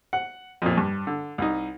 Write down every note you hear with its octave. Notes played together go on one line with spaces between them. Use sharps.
F#5
F2 A#2
G2
D3
C2 D#4